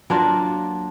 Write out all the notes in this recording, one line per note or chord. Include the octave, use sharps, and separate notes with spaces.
F#3 A#3 D4 F4